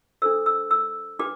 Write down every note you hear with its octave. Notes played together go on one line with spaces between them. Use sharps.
D4 A4 C5 E6
E6
E6
D4 G4 B4 D6